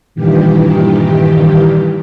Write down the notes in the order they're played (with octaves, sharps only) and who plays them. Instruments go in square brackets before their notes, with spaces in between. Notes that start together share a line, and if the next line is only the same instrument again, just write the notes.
[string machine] G2 A#2 D#3 E3 G4